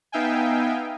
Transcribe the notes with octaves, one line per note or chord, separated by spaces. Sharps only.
B3 D#4 E5 F5 G5 G#5